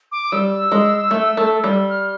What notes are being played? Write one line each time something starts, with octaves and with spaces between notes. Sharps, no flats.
D6
G3 E6
G#3
A3
A3
G3
F6